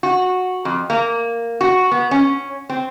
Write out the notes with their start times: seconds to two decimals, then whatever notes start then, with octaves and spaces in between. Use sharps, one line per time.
0.03 F#4
0.65 F2
0.90 A#3
1.61 F#4
1.91 B3
2.11 C#4
2.69 C4